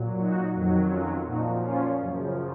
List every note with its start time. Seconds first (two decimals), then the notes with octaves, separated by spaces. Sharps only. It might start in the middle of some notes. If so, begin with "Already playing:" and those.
Already playing: A#2 F#3
0.19 D#4 F#4
0.54 F2 D#3 F#3
0.90 C#4 F4
1.26 A#2 F3 D#4 F#4
1.61 C#4 F4
1.98 F#2 C#3 F3